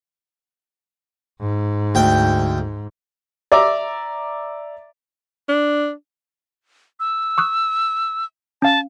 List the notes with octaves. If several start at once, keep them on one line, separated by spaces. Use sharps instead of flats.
G#2
D2 G5
D5 E5 A#5 D6
D4
E6
C#6 D#6 F#6
C#4 F5 A5